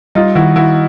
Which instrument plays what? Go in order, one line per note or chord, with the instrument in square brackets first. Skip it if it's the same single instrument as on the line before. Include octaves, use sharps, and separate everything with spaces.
[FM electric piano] G3 [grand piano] D#4 F4
[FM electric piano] D#3 [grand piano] E4 F#4
[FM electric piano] D#3 [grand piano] E4 F#4